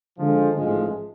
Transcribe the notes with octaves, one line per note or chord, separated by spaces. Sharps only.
D3 F3 G#3
A1 G#2 F3 G#3